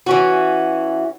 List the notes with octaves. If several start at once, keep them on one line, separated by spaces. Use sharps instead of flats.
E3 C#4 F#4